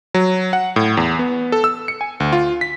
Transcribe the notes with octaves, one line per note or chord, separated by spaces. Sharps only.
F#3
F#5
A2
E2
B3
A4
E6
C#7
G#5
D2
F4
B6